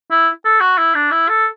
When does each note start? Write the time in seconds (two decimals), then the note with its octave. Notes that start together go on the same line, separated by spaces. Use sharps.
0.11 E4
0.45 A4
0.61 F#4
0.78 E4
0.95 D4
1.11 E4
1.29 A4